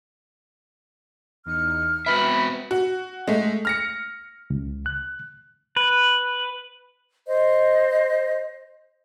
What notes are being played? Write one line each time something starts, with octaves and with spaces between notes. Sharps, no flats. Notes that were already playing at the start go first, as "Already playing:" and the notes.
E2 D#4 F6 C#7
B3 C4 F#4 B4 E5 B5
F#4
G#3 A3
F6 A#6 C#7
C#2
F#6
B4
C5 D#5